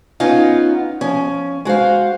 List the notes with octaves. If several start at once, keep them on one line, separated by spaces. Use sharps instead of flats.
B3 C#4 D#4 F4
F3 C#4
G#3 F#4 C5 F5